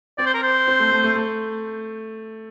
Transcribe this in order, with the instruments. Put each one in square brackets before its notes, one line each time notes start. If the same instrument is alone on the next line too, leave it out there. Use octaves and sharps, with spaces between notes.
[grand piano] C4 [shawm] D5
[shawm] C5
A#4
C5
[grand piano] C4
A3
A3
A3
A3